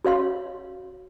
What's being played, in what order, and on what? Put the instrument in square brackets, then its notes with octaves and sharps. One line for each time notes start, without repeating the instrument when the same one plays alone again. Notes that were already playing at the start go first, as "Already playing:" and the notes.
[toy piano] F#4 C#5 F5 C6